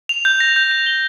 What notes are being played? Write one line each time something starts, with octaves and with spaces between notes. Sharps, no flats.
F7
G6
A#6
G6
F7
G7